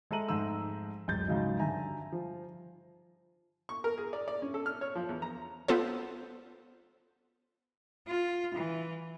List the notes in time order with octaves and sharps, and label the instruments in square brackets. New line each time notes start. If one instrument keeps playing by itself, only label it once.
[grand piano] G#3 A4 E5 A#5 D#7 F#7
F2 G#2 G#3 A3 A#5 E6
D1 F#2 G#3 G6 A6
F2 G#2 C#3 F#3 D#4
G2 D3 E5 G#5 A#5
F3
[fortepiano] C#6
A#4
G#4
D5
D5
C#4
A4
F6
C#5
F3
E2
A#5
[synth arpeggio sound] B3 F4 A4 C5
[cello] F4
E3